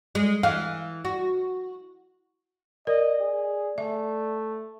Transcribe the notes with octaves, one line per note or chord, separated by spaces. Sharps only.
G#3
E3 F5
F#4
A#4 D5 D#5
G#4
A3 E5